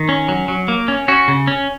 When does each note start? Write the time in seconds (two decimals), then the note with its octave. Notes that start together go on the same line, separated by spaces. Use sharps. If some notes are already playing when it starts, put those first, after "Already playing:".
Already playing: D#3
0.09 C#4
0.29 F#3
0.48 F#3
0.68 A#3
0.88 C#4
1.08 C#4 F#4
1.28 C#3
1.47 C#4